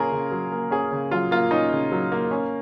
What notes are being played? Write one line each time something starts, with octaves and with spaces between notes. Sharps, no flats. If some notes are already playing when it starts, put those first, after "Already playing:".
Already playing: C#3 A#3 C#4 F4 G#4 A#4
C#3
F#3
A#3
C#4 G#4
C#3
F#3 F4
A#3 F4
C#4 D#4
C#3
F#3
A#3
C#4